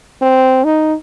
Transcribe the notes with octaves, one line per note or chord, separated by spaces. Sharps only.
C4
D#4